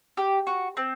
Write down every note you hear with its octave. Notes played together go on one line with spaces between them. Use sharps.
G4
F#4
C4